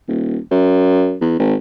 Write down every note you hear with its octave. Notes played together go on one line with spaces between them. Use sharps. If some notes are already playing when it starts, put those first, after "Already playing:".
D#1
F#2
E2
G#1